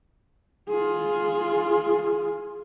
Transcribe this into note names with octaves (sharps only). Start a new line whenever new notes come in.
F4 G#4